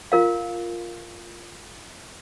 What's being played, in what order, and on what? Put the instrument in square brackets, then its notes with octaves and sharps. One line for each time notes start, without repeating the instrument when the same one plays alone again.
[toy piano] F4 A#4 F5